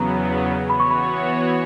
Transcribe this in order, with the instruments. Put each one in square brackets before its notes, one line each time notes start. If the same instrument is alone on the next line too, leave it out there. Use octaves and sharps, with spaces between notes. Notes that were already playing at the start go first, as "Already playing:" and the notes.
Already playing: [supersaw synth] E2 C#3 F#3 B3 [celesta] A#5
[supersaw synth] E3 B3 F#4 C#5 [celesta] B5
[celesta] C#6
B5